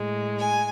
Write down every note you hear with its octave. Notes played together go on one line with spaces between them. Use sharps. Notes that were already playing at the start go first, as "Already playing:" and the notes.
Already playing: A2 G#3
G#5